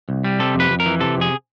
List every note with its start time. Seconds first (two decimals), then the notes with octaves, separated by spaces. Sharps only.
0.09 C2
0.24 G3
0.39 C3 A4
0.55 F2
0.60 B4
0.70 F2
0.80 A#4
0.86 E3
1.00 C3 A4
1.17 F2 G#4